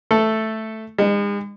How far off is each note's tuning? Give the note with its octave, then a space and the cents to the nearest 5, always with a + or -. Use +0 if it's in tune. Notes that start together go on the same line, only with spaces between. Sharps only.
A3 +0 A4 +0
G#3 -40 D#4 -35 D#5 -40